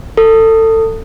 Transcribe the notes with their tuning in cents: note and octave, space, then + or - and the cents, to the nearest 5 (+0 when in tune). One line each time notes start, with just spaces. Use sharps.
A4 +25